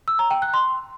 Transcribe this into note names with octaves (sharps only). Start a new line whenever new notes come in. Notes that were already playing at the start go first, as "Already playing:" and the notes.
E6
A#5
G5
F#6
C6